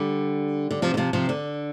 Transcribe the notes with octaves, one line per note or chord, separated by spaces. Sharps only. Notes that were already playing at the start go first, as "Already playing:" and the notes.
Already playing: D3 G3
D3
C3 F3
D3
C3 F3
C3 F3
D3